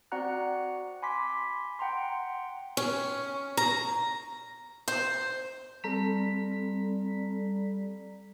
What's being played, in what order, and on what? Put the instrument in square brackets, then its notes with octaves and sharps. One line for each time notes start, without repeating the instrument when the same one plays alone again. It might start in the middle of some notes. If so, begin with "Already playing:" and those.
[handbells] C4 F#4 D5 F#5 A#5 F#6
G#5 B5 C6 D6 B6
F#5 G5 A#5 C6
[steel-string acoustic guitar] C#4
A#5
C5
[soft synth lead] G3 [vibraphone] C4 [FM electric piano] A4 A#5 B6